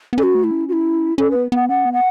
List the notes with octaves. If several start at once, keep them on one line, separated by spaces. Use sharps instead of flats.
B3
C#4 A4
F#4
A3
E4
C#4
F#4
E4
C#4 A4
B3 B4
B3 F#5
C#4 F#5
B3
F#5